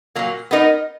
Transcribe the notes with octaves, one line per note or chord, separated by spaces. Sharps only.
A#2 F#3 A#3
B3 D#4 A#4 D#5